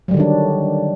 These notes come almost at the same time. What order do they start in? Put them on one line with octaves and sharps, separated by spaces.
F#3 G3 D3 D#3 D4